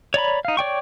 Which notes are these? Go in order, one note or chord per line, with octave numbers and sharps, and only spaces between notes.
C#5 D5 A#5 B5
D#4 F5
C#5 D5 G5 C#6